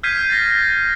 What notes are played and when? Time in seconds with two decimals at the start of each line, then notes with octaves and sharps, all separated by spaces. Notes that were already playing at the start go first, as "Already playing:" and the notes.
0.03 F6 G6 G#6 B6 C7 D#7
0.30 A6 A#6